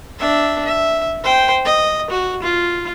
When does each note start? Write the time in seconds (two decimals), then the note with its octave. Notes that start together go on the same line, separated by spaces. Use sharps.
0.19 D4 E5
0.65 E5
1.24 C5 G5
1.65 D#5
2.11 F#4
2.42 F4